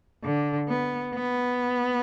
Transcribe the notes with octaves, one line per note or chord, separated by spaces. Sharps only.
D3
B3
B3